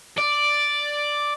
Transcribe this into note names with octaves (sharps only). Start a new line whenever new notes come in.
D5